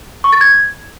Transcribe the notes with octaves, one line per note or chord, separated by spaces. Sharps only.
C#6
A6
G#6